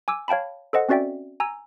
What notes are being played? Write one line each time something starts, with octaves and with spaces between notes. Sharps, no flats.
G#5 D6 E6
C#5 F5 G5 A5 B5
A4 C5 D#5 F#5
C4 C#4 F#4 D5 E5 G5
G#5 A#5 E6